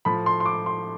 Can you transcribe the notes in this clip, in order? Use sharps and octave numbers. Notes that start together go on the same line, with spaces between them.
A2 F3 B5
C6
C6
D6
C6